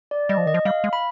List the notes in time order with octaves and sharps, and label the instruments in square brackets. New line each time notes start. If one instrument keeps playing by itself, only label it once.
[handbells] D5
[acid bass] G3 [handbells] D#5
[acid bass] F3
[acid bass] D#3 [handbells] D#5
[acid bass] F3
[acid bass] G3 [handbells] F5
[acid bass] G#3
[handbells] B5